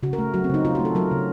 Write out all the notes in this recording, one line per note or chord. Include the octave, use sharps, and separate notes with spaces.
C#3 F#4
A#4
A3
F#3 F#4
C4
C#3 D#4
C#3 F4
F#4
A3
A4
F#3 A#4
C#3